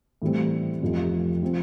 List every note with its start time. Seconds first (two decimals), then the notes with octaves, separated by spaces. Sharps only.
0.22 A2 E3 G3 C4
0.82 F1 F2 C3 F3
1.43 F3 C4